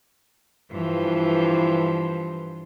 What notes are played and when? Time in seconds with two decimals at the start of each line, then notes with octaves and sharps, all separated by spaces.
0.71 G2 E3 F3